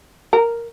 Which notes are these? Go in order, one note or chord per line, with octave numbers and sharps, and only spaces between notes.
A#4